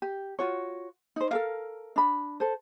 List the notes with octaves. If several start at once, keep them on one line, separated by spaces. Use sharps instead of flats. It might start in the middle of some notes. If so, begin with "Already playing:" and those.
G4
F4 F#4 C#5
D#4 C5
A4 A#4 F5
D4 B5
A4 C5